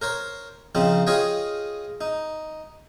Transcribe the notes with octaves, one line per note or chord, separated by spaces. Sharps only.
A#4 C5 C#5
C#3 F3 C4 D#4
F4 G#4 C#5 D#5 G5
D#4